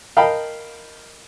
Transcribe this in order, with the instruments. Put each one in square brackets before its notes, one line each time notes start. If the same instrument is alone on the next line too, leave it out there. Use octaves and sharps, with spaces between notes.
[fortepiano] A#4 D#5 F5 G5 A5 B5